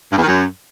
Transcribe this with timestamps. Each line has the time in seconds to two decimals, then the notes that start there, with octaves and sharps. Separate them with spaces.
0.12 G2
0.17 E2
0.22 D#3
0.27 F#2